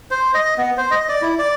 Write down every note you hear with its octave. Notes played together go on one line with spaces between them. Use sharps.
C5
D#5
B3
C5
D#5
D5
E4
D5